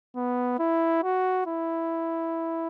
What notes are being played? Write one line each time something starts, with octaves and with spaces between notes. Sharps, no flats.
B3
E4
F#4
E4